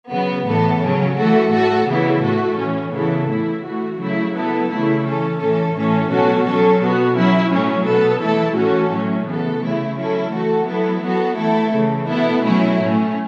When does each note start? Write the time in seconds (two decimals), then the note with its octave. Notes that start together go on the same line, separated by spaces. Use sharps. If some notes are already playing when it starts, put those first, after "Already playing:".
0.11 C#3 F#3 B3
0.46 A2 E3 B3 A4
0.81 C#3 F#3 C#4
1.16 E3 A3 F#4 A4
1.52 A2 A3 F#4 A4
1.87 C#3 E3 B3 E4
2.22 A2 A3 F#4 A4
2.57 A2 E3 C#4
2.93 C#3 E3 B3 E4 A4
3.27 A2 E3 A3 E4
3.64 E3 A3 F#4
3.98 C#3 F#3 A3 E4
4.34 F#3 B3 E4 A4
4.69 C#3 E3 A3 E4
5.04 E3 C#4 A4
5.39 A2 E3 C#4 A4
5.74 A2 E3 C#4 A4
6.10 B2 F#3 C#4 F#4 A4
6.45 F#3 C#4 A4
6.80 B2 B3 F#4
7.15 F#3 C#4 E4
7.51 A2 F#3 A3 C#4
7.86 B2 B3 A4
8.21 E3 A3 E4 A4
8.56 A2 E3 C#4 F#4 A4
8.92 A2 F#3 A3 C#4
9.27 C#3 E3 B3 A4
9.62 C#3 A3 E4
9.97 F#3 C#4 E4 A4
10.32 E3 A3 F#4 A4
10.67 F#3 B3 E4 A4
11.03 F#3 B3 F#4 A4
11.38 E3 A3 E4 A4
11.73 C#3 E3 A3
12.08 B2 B3 E4 A4
12.44 F#3 A3 C#4 E4
12.79 A2 A3 C#4